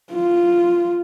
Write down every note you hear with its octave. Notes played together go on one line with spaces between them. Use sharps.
F4